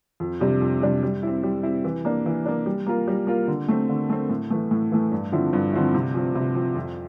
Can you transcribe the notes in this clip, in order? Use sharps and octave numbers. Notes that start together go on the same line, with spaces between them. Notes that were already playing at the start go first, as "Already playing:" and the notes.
F2
C3 G3 D4 G4
F2
C3 G3 D4 G4
G3
C4 E4
G3
C4 E4
E3
A#3 D4
E3
A#3 D4
G3
A#3 F4 A#4
G3
A#3 F4 A#4
D3
A3 C4
D3
A3 C4
A2
E3 A3
A2
E3 A3
G2
D3 F3 C4 E4
G2
D3 F3 C4 E4
C3
F3 C4
C3
F3 C4
F2